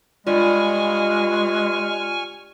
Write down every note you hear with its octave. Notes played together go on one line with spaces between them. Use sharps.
G2 G#3 F4 D5 G#5 C#6 F6